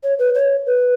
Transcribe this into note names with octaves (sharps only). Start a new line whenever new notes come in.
C#5
B4
C#5
B4